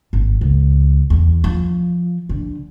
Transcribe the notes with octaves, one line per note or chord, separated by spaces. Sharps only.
G#1
C#2
E2
F3
D3